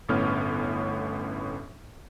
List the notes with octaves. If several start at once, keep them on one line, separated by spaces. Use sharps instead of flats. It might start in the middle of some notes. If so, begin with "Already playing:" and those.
G1 A2 B3 C#4 F6